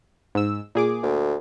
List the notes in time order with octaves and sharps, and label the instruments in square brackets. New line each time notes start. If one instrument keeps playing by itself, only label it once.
[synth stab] G#2 E6
A#2 G#4 D6
[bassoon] D2